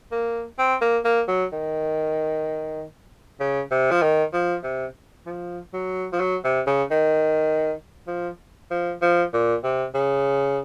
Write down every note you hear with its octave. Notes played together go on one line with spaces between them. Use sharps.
A#3
C4
A#3
A#3
F#3
D#3
C#3
C3
F3
D#3
F3
C3
F3
F#3
F3
F#3
C3
C#3
D#3
F3
F3
F3
A#2
C3
C#3